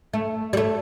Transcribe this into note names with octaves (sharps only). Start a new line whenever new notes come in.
A3
G3
A3